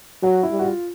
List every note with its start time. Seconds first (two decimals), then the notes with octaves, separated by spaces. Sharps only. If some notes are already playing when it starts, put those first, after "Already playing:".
0.23 F#3 F#4
0.43 E4
0.51 G3
0.59 F#4
0.64 F4